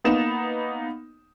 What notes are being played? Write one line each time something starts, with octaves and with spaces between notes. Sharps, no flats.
A#3 B3 D#4 E7